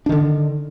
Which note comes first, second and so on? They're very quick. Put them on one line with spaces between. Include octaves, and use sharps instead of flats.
D4 D#3 D3